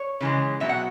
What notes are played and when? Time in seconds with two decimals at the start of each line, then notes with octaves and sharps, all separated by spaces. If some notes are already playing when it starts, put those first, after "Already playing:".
Already playing: C#5
0.21 C#3 E3 G#3
0.60 B2 F#3 E5
0.69 F#5